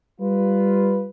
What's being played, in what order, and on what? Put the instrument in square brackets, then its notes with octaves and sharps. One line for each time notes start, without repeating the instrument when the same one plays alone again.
[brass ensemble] G3 F4 B4